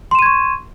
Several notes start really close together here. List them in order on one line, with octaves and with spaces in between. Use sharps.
C6 E7 D#7 G#6 C#6